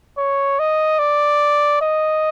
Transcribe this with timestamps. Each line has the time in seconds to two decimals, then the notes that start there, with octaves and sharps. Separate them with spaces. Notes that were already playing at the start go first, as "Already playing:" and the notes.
0.18 C#5
0.59 D#5
0.99 D5
1.81 D#5